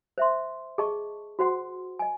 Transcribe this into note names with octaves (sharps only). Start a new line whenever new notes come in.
C5 E5 C6
G#4 D#5 A5 C#6
F#4 C5 F#5 C6
D#5 G#5